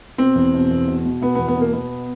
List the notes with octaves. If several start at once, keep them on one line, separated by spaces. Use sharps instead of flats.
B2 C4
E2
B2
E2
B2
B2
B2 B3
E2 B3
B3
B2 A#3
B2 B3